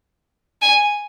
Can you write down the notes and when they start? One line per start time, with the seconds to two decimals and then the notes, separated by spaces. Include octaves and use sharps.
0.62 G#5